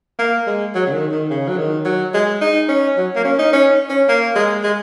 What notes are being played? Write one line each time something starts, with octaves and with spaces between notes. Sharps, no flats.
A#3
G#3
F#3
C#3
D#3
D#3
C#3
F#3
D#3
F#3
G#3
D#4
C#4
F#3
A#3
C#4
D#4
C#4
C#4
A#3
G#3
G#3